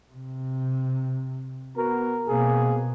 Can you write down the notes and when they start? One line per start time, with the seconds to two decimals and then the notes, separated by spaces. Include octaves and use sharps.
0.13 C3
1.76 B3 F#4 A#4
2.28 B2 A#3 C4 G#4